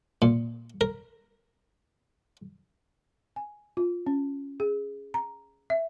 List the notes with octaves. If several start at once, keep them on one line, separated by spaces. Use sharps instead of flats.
A#2
A#4
G#5
F4
C#4
G#4
A#5
E5